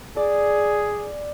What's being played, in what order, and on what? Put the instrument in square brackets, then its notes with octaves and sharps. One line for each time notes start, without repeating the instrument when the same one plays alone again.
[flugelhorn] G#4 [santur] D5